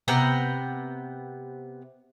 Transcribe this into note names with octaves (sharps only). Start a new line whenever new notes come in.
C3 B3 G5 A#5